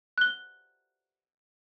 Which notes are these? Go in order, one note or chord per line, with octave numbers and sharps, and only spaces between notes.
F#6 G7